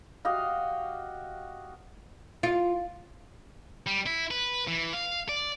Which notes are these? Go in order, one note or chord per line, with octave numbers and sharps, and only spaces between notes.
F#4 G4 D#5 F5
F4
G3
E4
B4
E3
F5
D5